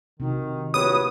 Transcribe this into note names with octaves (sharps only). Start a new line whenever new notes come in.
C3 D#3 D#4 F#4
A#1 A3 C4 F#4 G4 B4 C#5 D#6